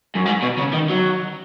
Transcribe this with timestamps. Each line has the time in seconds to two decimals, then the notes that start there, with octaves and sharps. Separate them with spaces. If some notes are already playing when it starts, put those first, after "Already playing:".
0.16 F#2
0.26 G#2
0.42 B2
0.59 C#3
0.74 D#3
0.90 F#3